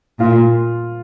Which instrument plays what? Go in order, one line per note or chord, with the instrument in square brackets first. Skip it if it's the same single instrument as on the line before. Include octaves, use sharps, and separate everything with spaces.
[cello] A#2 [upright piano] F4